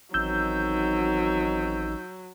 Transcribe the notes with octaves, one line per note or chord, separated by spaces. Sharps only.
A1 D#3 F#3 C4 D#4 E6 G6